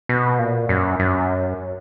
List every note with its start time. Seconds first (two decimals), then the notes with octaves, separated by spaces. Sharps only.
0.09 B2
0.39 A#2
0.69 F#2
0.99 F#2